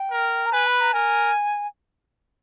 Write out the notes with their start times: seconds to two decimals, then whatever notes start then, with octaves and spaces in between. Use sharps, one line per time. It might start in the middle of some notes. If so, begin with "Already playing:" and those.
Already playing: G5
0.11 A#4
0.46 A#5
0.52 B4 G#5
0.67 B5
0.80 A#5
0.93 A#4 G#5